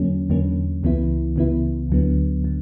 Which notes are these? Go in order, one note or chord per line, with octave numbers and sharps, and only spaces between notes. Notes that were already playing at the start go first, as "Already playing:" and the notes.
Already playing: E2 D3 F#3 A#3 C#4
E2 D3 F#3 A#3 C#4
C#2 C#3 E3 B3 E4
C#2 C#3 E3 B3 E4
D2 D3 F#3 B3
D3